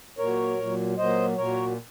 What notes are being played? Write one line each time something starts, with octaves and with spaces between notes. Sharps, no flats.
A#2 F#3 A#4 C#5
A#2 F#3
A#2 F#3 C5 D#5
A#2 F#3 A#4 C#5